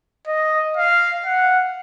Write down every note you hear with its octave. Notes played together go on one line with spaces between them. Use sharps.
D#5
F5
F#5